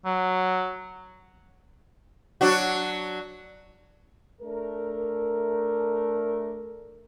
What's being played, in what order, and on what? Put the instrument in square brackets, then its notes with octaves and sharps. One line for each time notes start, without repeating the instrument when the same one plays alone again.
[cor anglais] F#3
[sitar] F#3 D4 F#4
[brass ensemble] A3 D4 A#4